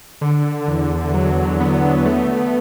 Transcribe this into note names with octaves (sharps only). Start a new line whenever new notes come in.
D3
E2
F#3
B3
A3